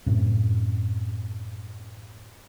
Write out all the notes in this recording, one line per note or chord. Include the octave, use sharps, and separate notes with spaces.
F#2 A2 C3